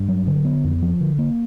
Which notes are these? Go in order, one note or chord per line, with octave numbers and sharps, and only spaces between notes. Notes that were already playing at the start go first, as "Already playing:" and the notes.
Already playing: G2
F#3
D3
B3
F2
F3
D3
A#3